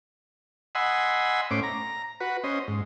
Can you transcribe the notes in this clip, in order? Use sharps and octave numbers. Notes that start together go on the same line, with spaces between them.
D#5 F#5 G#5 B5 C6 E6
A2 C#4 C5 D6
A#5
F#4 B4
C#4 C5 D#5
G#2